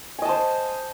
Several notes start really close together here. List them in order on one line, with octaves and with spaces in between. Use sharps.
G#5 D#5 A5 C5